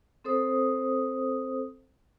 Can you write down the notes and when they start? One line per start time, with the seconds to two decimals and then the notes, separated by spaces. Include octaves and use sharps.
0.24 C4 A4 C5 D#6